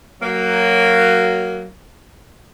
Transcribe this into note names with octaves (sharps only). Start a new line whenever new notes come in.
F#3 A#3